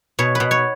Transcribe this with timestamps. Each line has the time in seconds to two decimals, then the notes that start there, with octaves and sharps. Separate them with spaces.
0.19 B2 C#5
0.35 B2 B4
0.51 C#5